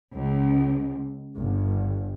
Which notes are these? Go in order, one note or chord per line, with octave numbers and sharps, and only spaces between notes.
C#2
G1